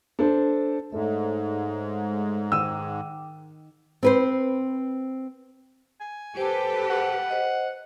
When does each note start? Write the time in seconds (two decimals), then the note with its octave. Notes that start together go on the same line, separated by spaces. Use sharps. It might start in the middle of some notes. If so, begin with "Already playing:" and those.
0.19 D4 A4 C5
0.92 G#2 G#3 A3 D#4 A4 C#5 E5
2.52 D#3 G5 D6 E6 D#7
4.03 C4 B4 C5
6.01 G#5
6.37 G4 A4 B4 C5 A5
6.90 F#5
7.30 C5 D#5